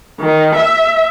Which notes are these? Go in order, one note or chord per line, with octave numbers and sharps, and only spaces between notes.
D#3
E5